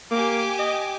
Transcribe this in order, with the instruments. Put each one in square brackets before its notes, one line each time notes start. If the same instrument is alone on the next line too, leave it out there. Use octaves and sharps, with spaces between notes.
[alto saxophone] A#3 [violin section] G4 G#5 D6
[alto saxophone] D#5